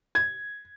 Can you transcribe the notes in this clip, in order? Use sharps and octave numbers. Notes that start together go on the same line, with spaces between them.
G#6